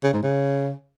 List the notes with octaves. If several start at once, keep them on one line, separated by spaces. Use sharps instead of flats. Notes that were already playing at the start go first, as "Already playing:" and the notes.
C#3
G#2
C#3